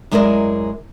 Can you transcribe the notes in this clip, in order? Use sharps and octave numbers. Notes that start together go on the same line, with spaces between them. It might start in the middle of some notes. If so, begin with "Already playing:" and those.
F#2 G#3 E4 G#4 A#4 D5